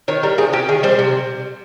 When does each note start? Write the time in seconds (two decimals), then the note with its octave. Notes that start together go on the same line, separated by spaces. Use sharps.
0.08 D#3 C#5
0.23 G3 A#4
0.38 C3 G#4
0.53 C#4 G4
0.69 D#3 G#4
0.83 G3 C5
0.99 C3